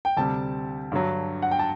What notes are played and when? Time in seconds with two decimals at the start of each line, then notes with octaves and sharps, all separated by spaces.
0.05 G5
0.17 D2 C3 G3 A5
0.92 G2 D3 F#3
1.42 F#5
1.51 G5
1.59 A5